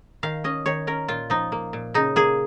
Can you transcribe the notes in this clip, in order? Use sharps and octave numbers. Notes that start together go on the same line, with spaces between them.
D#3 F5
C#4 D#5
D#3 C#5
C#4 A#4
A#2 F4
F3 D#4
A#3
A#2
C#3 D#4
A#3 G#4